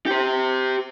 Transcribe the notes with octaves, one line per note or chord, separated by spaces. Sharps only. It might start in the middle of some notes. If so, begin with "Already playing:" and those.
G4 C5